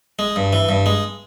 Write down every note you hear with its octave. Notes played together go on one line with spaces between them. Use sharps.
G#3
G2
E3
G2
G#3